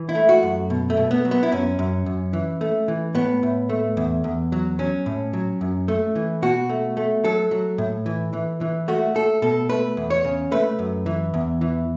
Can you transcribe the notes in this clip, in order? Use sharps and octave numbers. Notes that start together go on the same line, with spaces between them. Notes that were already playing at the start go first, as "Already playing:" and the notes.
Already playing: E3
E4
A3
F#4
F#2
B2
A3
B2
B3
F#3
B3
E4
F#2 C#4
F#2
F#2
E3
A3
E3
A2 B3
A2
A3
E2
E2
F#3
F#3 C#4
A2
F#3
F#2
A3
E3
B2 F#4
A3
A3
F#3 A4
F#3
A2
E3
E3
E3
A3 F#4
A3 A4
B2 A4
A3 B4
E2
C#5
C#3
A3 B4
F#2
E3
E2
E3